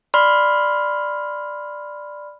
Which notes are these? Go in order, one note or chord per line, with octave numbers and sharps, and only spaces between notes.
D5 B5 C6 F6